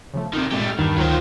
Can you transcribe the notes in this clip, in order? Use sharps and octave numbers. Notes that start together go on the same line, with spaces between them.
C#3 F3 A3
C3 D#3 G6
A#2 G#3 A3 G4
F6 G6
E2 G2 D#3
D2 F#3 F4 C5 G5